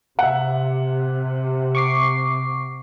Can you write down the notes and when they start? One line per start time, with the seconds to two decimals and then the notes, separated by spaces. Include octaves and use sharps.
0.19 C3 E5 F#5
1.75 C#6 D6 C7